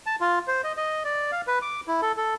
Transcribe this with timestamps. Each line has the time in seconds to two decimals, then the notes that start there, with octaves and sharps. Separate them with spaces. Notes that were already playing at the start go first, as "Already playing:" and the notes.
0.06 A5
0.21 F4
0.48 C5
0.64 D#5
0.77 D#5
1.04 D5
1.32 F5
1.47 B4
1.62 D6
1.87 E4
2.02 A4
2.17 A4